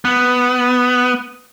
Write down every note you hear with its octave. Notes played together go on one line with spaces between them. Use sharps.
B3